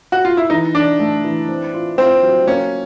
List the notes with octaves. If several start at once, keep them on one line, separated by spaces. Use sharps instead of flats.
F#4
F4
E4
E3 D#4
E3 D4
A3
E3
C4
F4
C4 F4
F#3
A#3 C#4